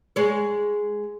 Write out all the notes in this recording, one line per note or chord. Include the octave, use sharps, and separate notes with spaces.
G#3 C#5